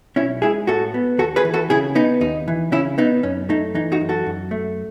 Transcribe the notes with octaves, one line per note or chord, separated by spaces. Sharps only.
B1 C#4 E4
G#3 E4 G#4
A2 F#4 A4
B3
D#2 F#4 A4
G#4 B4
E3
F#4 A4
C#3 E4 G#4
B3 D#4
D#2 D#4
E3
C#3 C#4 E4
B3 D#4
F#2 C#4
A3 D#4
E3 D#4
D#4 F#4
F#2
F#4 A4
F#2
A3